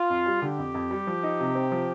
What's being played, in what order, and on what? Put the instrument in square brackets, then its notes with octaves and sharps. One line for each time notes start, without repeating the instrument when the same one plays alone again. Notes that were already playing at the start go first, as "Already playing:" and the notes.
Already playing: [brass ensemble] F4
[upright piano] F2
G3
[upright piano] D3 [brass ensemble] G4
[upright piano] F2
F2
G3
F3
D#4
C3
C4
F3